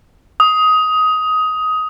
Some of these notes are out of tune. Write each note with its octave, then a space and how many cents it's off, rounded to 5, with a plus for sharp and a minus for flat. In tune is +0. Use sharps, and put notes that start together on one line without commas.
D#6 +15